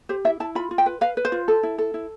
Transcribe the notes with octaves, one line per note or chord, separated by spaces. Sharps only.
G4 C5
E4 E5
E4 A5
F4 B5
F4
G5
B4
B4 F5
B4
C5
F4
A4
E4
A4
E4